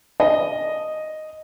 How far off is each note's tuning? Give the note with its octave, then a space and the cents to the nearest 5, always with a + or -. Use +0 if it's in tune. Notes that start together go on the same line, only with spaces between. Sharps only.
D#5 -5